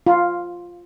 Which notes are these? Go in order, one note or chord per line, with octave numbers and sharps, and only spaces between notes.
F4